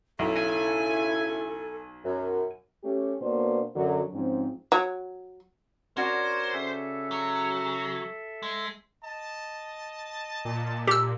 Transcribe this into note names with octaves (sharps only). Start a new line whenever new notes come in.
B1 C#3 E4 A4
G#5
F#2
A3 C#4 G4
B2 A#3 D4 C5
F#2 D3 F#3
G#2 F3 C4 C#4
F#3
C#4 D4 F#4 A#4 C5 C#5
C#3 A4 E5
F#3
G#3
D#5 A5
A#2
G4 E6